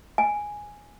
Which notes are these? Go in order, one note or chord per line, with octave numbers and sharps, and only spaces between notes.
G#5